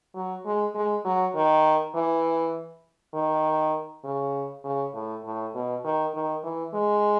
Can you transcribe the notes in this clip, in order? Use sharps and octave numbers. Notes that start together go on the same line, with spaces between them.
F#3
G#3
G#3
F#3
D#3
E3
D#3
C#3
C#3
A2
A2
B2
D#3
D#3
E3
G#3